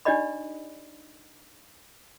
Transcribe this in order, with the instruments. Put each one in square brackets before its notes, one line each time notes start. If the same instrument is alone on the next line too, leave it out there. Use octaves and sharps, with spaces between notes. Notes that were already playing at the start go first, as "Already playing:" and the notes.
[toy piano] D4 D#4 G4 D5 D#5 B5